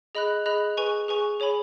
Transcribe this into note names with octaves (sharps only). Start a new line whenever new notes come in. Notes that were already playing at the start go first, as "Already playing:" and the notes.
G#4 D#5 B5 F#6
G#4 D#5 B5 F#6
G#4 B4 G#5 C#6
G#4 B4 G#5 C#6
G#4 C#5 G#5 B5